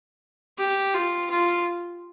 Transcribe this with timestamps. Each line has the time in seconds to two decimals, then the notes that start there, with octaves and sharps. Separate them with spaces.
0.59 G4
0.94 F4
1.31 F4